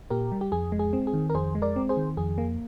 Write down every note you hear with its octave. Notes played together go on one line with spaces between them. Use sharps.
A#2 G4 A#4
G3
G4
F2 G#4
G#3
G#4
C4
G#4
D#3
A#4
F2 G#4 C5
G#3
A#4 D5
C4
G#4 C5
D#3
F2 G#4
A#3